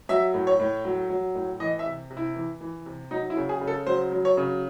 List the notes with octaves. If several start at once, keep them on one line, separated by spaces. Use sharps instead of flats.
F#3 E5
A2
C#5
A2
F#3
F#3
A2
E3 D#5
E5
C3
C3
E4
E3
E3
C3
F#3 D#4
E4
C#3
G#4
C#3
A4
F#3 C5
F#3
C#5
C#3